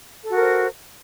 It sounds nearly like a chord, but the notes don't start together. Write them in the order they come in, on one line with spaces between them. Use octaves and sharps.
A4 F#4 A#4 C5